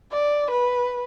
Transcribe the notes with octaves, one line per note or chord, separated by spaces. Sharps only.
D5
B4